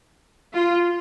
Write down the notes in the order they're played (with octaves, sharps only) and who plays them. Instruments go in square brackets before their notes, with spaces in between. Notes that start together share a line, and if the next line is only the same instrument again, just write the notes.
[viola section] F4